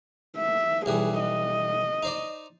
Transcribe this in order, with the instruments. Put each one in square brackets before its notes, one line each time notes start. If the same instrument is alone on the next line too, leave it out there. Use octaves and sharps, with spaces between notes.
[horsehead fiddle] E5
[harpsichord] B1 E3 G3 [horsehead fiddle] G#4
[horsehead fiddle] D#5
[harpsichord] D#4 C5 D5